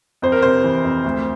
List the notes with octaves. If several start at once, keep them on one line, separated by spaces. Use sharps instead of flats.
F2 C5
A#4
C3 C5
E3
F2
D2